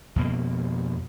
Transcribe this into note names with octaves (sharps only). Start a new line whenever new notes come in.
F2 B2 A#3